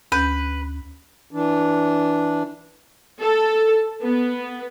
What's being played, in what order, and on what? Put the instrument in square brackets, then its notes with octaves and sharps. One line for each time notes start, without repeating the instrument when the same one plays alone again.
[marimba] D2 C#4 G6 [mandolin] B4
[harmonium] E3 D4
[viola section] A4
B3